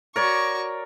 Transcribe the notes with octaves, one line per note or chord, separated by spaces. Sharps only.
F#4 A#4 C#5 D5 C#6